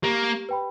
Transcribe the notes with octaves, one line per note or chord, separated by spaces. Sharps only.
A#3 G4
B4 G5 B5